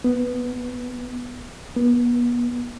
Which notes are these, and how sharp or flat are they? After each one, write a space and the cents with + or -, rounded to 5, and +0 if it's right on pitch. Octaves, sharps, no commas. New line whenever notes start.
B3 +5
B3 -35